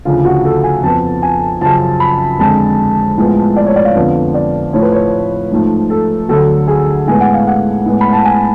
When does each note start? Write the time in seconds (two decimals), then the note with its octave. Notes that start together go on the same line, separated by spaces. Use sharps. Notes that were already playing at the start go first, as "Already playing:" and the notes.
0.05 D2 C#3 F3 F4
0.25 F#4
0.45 A4
0.64 G#5
0.83 F2 F3 B3 A5
1.22 G#5
1.61 F#2 C#3 F3 A5
2.00 B5
2.39 F2 D3 G#3 A5
3.17 A2 F3 G#3 B3
3.56 D5
3.66 C#5
3.76 D5
3.85 F5
3.95 F2 D3 F3 B3
4.34 D5
4.73 A2 F3 A3 C#5
4.83 B4
4.93 C#5
5.52 G#2 F3 A3
5.90 A4
6.29 D2 D3 F#3 A3 A4
6.68 G#4
7.07 A2 G#3 B3 G#5
7.20 F#5
7.34 F5
7.47 F#5
7.86 A2 G#3 B3
8.01 B5
8.12 A5
8.25 G#5